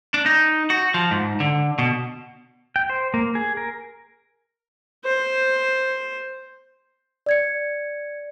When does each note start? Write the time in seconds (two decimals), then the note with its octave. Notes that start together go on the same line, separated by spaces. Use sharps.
0.14 D4
0.26 D#4
0.70 F#4
0.94 F3
1.11 G#2
1.40 D3
1.79 B2
2.76 G5
2.90 C5
3.14 A#3
3.35 G#4
3.57 A#4
5.05 C5
7.26 D5 G#6 C#7